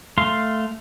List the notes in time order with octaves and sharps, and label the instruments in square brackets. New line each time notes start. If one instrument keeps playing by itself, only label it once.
[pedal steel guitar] A3 F5 C6